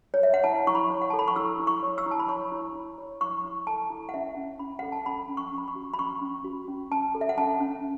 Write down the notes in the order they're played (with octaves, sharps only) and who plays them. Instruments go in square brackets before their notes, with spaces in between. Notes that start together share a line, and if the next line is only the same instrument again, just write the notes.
[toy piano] C#5
E5
F#5
E4 A5
E4 C#6
B5
C#5
F#5
A4 A5
B5
C#6
E4 E6
E4
C#6
C#5
E6
E4
A5
B5
C#5 C#6
E4
E4
C#5
E4 C#6
E4
A4 A5
E4
F#5
C#4 E5
C#4
C#4 B5
A4 F#5
A5
C#4 B5
C#4
C#6
C#4
B5
C#6
F#4
B5
C#4 C#6
C#4
F#4
C#4
C#4 A5
A4
E5
F#5
C#4 A5
C#4